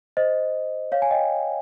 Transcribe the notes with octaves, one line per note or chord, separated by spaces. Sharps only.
C5 D#5
C#5 F5
G#5
D#5 G5